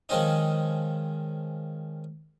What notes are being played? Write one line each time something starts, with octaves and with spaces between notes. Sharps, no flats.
D#3 F3 G#3 C4 C#4 D#4